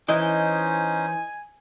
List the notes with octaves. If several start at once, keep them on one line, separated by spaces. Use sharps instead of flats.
E3 C#4 D#4 C5 D#5 G#5